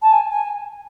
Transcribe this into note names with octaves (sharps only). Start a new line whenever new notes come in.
A5
G#5
G#5